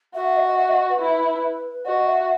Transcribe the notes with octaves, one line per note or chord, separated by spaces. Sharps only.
F#4 E5
D#5
E5
D#5
B4
E4
F#4 D#5
E5